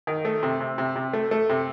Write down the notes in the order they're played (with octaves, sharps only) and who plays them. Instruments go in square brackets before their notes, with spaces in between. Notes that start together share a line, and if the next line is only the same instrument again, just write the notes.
[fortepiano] D#3
A3
C3
C3
C3
C3
A3
A3
C3